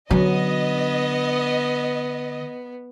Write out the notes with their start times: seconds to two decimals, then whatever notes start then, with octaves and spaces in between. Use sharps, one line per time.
0.11 D3 F#3 B3 D#5